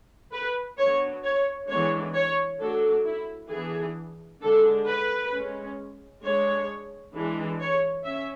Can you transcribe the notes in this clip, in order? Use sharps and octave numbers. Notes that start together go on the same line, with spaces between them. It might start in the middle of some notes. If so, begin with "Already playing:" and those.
B4
F#3 B3 D4 C#5
C#5
E3 G#3 B3 D4 C#5
C#5
F#3 A3 D4 A4
E4
E3 B3 D4 G#4
D3 G#3 D4 A4
B4
G#3 C#4
G#3 D4 C#5
E3 G#3 D4
C#5
C#4 E5